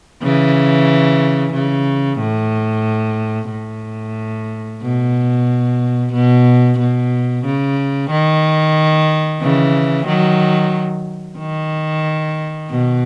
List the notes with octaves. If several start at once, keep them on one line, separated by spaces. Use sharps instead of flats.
C#3 E3
C#3
A2
A2
B2
B2
B2
C#3
D#3
C#3 E3
D#3 F#3
D#3
B2